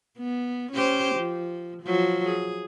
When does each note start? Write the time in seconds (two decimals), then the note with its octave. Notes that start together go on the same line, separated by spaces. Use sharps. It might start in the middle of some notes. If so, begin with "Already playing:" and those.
0.18 B3
0.72 C#4 G4 C5
1.15 F3
1.83 F3 F#3
2.25 G#4